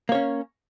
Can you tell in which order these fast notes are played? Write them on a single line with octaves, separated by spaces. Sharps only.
A#3 C#5 C#4